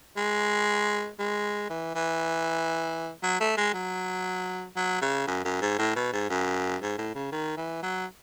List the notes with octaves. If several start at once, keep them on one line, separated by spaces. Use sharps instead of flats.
G#3
G#3
E3
E3
F#3
A3
G#3
F#3
F#3
C#3
F#2
F#2
G#2
A2
B2
G#2
F#2
G#2
A2
C#3
D#3
E3
F#3